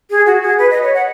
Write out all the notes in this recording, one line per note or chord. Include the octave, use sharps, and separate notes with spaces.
G#4
F#4
G#4
B4
D#5
C#5
F#5